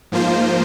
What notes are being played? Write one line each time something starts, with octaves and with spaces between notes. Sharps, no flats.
G#2 F3 A#3 F4 C5